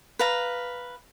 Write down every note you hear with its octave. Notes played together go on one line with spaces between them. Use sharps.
B4 F5 A#5